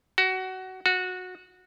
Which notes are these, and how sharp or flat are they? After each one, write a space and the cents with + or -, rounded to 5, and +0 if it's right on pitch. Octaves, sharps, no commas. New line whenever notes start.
F#4 +20
F#4 -15